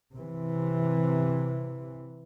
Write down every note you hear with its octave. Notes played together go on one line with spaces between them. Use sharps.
C3 E3